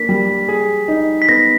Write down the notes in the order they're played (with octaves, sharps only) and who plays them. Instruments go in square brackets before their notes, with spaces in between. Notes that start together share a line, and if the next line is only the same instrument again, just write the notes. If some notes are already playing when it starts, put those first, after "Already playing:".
Already playing: [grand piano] A#3 D4 [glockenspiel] B6
[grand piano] G3
G#4
D#4
[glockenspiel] B6
[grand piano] B3 [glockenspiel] A#6